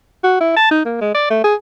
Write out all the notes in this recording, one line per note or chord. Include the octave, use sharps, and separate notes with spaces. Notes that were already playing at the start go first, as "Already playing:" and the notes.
F#4
E4
A5
D#4
A#3
G#3
D5
A3
G#4